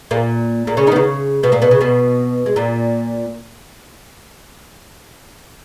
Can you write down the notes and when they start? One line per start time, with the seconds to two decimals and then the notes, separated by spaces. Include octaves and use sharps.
0.11 A#2 A#3
0.67 A#2 A#3
0.77 C#3 C#4
0.87 D#3 D#4
0.92 B3
0.96 C#3 C#4
1.43 B2 B3
1.52 A#2 A#3
1.62 B2 B3
1.71 C#3 C#4
1.81 B2 B3
2.46 G#3
2.56 A#2 A#3